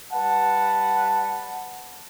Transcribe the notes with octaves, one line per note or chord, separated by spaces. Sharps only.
G3 B4 F#5 A5